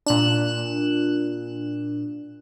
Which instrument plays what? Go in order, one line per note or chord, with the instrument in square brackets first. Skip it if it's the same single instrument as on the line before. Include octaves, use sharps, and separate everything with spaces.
[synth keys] A#2 F#6 E7 [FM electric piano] D4